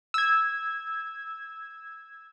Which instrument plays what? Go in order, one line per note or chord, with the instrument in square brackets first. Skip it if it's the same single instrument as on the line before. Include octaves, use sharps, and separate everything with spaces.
[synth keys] E6 G#6